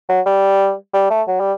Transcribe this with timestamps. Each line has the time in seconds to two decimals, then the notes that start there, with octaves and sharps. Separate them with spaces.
0.09 F#3
0.26 G3
0.93 G3
1.10 A3
1.28 F#3
1.40 G3